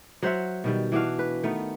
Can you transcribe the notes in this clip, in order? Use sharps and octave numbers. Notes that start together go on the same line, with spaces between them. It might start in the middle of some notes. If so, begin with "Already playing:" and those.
F#3 C5 E5 F#5
B2 D#3 G3
E3 D4 F#4 F5
B4
D#3 A3 B3 D#4